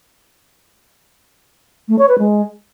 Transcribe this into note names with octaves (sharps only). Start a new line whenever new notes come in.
A3
C#5
B4
G#3